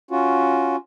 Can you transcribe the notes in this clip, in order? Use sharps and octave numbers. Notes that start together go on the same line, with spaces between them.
C#4 F4 F#4